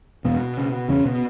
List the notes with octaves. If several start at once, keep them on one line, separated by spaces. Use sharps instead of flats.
E2 B2 B3
C#3
E2 C#3 C#4
B2 B3